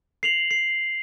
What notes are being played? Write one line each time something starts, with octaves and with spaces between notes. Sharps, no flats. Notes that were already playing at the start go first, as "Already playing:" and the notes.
C7 F7 F#7
C7